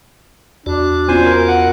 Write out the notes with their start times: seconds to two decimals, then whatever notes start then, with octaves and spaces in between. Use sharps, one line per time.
0.66 E2 D4 F#4 D5
1.09 B3 C#4 F4 C5 G#5
1.25 A#4
1.48 F#5